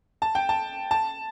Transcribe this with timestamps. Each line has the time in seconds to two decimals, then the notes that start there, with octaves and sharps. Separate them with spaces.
0.22 A5
0.35 G5
0.49 A5
0.91 A5